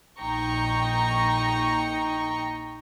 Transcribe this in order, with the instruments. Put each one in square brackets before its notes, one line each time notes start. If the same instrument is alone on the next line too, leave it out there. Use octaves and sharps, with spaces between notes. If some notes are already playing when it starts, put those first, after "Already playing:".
[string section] A#1 D#4 G5 A#5 C#6